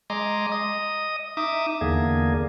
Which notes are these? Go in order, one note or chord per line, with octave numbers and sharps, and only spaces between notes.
G#3 D#5 A#5 C6 D6
D#5 D#6
D#4 E5 D6 D#6
E2 D3 A#3 G#4